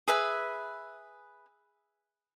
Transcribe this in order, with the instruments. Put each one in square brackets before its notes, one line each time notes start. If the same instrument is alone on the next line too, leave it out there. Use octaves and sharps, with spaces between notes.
[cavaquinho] G#4 B4 E5 G#5